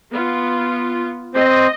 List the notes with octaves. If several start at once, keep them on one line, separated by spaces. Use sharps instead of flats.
B3 F4
C4 C5 D#5